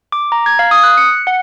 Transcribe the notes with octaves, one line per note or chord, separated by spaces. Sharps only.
D6
A#5
G#6
F5
D#6
F#6
C#7
F#5